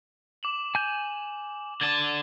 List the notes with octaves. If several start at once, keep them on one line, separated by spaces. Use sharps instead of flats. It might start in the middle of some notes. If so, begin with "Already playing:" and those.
D6 E7 F#7
G#5 G6
D3 A5 G#6 A6 D#7